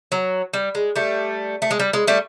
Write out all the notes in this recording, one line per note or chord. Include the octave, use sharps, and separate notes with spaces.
F#3
G3
G#3
G3 A3
A3
G#3
G3
G#3
G3 A3